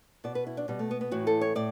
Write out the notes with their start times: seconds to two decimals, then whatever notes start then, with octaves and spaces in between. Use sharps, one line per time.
0.24 B2 D5
0.35 B4
0.47 E4
0.57 D4
0.68 B2 G3
0.79 A3
0.91 B3
1.01 B3
1.11 A2 E3 F#4
1.27 A4
1.41 C#5
1.55 A2 D5